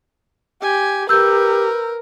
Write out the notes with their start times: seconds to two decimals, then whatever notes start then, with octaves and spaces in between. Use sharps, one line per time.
0.62 G4 G#5
1.09 G4 A#4 B4 E6 G6